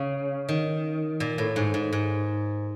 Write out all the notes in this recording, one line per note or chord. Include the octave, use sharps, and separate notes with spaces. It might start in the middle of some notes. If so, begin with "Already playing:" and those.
Already playing: C#3
D#3
A#2
A2
G#2
G#2
G#2